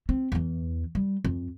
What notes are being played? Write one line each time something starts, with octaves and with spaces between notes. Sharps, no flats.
C4
E2 E3
G3
F2